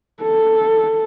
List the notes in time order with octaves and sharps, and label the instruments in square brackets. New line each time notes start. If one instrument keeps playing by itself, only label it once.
[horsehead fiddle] A4